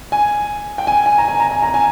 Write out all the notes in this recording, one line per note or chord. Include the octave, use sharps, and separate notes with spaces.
G#5
G5
G#5
G#5
A#5
G#5
A#5
G#5
A#5
G#5